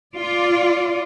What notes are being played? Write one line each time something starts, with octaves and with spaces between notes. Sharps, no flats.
F4 D5